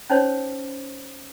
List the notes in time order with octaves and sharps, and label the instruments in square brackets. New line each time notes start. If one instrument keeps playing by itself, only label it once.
[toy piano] C#4 D#4 C5 C#5